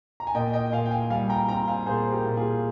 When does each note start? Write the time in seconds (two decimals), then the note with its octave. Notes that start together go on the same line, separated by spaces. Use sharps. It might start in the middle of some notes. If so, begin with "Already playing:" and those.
0.20 A#5
0.27 G#5
0.34 A#2 D#5 G5
0.53 D#5 G5
0.72 A#2 F5 G#5
0.86 G5
0.91 F5 G#5
1.10 G3 F5 G#5
1.29 G5 A#5
1.48 C4 G5 A#5
1.68 F5 G#5
1.86 A#2 G#4 C5
2.12 G4 A#4
2.25 A#2
2.37 F4 G#4